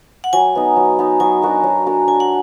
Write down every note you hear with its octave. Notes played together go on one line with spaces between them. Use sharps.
F#5
F#3 G#5
B3 D#4
F#3
B3 D#4
F#3 G#5
D4 F#4 A#4
F#3
D4 F#4 A#4
D4 G#5
F#5